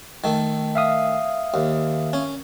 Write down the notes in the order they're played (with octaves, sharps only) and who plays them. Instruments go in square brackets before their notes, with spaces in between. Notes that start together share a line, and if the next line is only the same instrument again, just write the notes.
[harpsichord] D#3 A3
[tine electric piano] E5 F5 D#6
[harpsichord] D#2
C#4